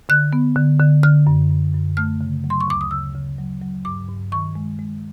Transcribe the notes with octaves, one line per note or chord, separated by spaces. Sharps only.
D3 F#6
B3
D3
D3
D3 F6
F#2
F#2
F#2
A3 F6
C#3
F#3
C6
C#6
D2 D6
D#6
C#3 E6
C#3
F#3
F#3
G2 D6
G2
D#3 C#6
G#3
G#3